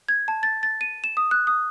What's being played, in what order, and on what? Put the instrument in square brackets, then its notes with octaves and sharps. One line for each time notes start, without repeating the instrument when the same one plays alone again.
[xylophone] G#6
A5
A6
A6
D#7
E7
D#6
F#6
D#6